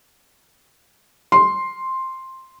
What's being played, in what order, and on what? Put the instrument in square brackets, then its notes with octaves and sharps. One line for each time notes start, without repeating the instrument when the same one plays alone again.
[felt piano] C6